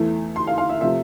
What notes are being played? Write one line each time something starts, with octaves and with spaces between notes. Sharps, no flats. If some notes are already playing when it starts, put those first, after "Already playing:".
Already playing: E2 E3 A3
C6
F5
F5
E5
C3 F3 A3 E5